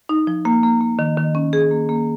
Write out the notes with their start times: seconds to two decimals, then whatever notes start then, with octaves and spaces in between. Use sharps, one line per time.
0.09 D#4
0.27 F3
0.45 A#3
0.63 A#3
0.81 A#3
0.99 D#3
1.17 D#3
1.35 C#4
1.53 G#4
1.71 A#3
1.89 A#3